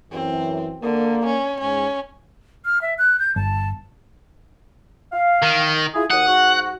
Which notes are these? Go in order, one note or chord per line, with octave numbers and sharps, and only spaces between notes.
F#2 E3 C4
D3 A#3
C#4
G#2 C#4
F6
E5
F#6
G6
G1 A5
F5
D#3
E4 F4 G#4
D#2 F#4 F#5 D#6
G#2 F#4